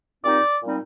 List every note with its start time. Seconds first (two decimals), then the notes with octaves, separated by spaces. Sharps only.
0.24 A#2 G3 C4 D#4 D5
0.63 A#2 G3 C4 D#4